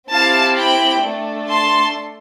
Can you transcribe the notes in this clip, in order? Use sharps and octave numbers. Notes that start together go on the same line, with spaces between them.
C4 E4 G4 F5 A5
G5 B5
A3 D4 A4
A5 C6